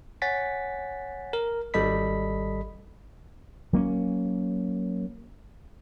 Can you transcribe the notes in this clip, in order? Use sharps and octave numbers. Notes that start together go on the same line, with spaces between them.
C#5 F#5 G#5 A6 B6
A#4
G#1 G3 A4 D#5 B5 B6
F#3 A#3 C4 C#4